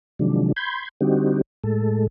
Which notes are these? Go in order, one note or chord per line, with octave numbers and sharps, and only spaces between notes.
C3 D#3 F3 F#3 G#3 D4
B5 C6 G6 G#6
D3 G3 C4 D#4 F#4 G4
A2 G#3 A4